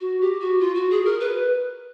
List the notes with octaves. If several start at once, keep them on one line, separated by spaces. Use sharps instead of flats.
F#4
G4
F#4
F4
F#4
G#4
A#4
B4